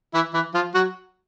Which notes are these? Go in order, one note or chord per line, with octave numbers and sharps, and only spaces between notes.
E3 E4
E3 E4
F3 F4
F#3 F#4